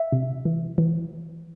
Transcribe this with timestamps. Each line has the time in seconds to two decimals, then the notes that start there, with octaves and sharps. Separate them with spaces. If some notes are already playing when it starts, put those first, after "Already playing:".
Already playing: E5
0.12 C3
0.45 E3
0.78 E3